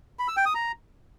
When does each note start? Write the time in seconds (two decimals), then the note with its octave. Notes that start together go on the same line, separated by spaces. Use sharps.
0.19 B5
0.28 E6
0.37 G5
0.46 D#6
0.55 A#5